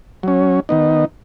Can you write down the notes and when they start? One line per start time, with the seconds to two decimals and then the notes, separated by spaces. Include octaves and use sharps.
0.23 F#3 C#4
0.69 D#3 B3 D#4